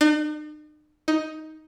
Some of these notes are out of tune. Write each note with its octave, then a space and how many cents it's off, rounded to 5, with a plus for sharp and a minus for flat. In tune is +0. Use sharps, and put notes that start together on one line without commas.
D#4 -45
D#4 +10